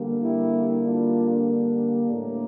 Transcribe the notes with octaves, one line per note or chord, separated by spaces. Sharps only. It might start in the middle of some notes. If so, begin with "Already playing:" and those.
Already playing: D3 G3 A#3
E4 G4
D4 F4
D4
A2 G3 A#3